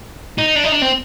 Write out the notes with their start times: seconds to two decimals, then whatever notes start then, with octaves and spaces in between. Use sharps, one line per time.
0.38 D#4
0.56 D4
0.64 D#4
0.73 D4
0.82 C4